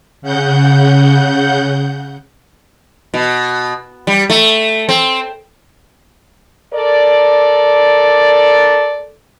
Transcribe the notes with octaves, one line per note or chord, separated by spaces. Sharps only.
C#3 F#5 G6
B2
G3
A3
C4
A4 A#4 D5